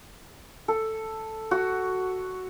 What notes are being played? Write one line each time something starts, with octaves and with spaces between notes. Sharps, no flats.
A4
F#4